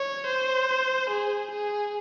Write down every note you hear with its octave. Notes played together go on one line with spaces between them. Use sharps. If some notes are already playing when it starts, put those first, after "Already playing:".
Already playing: C#5
C5
G#4
G#4